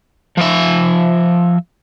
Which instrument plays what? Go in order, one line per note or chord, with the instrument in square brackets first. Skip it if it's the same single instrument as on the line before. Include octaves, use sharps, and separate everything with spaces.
[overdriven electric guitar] F3 E5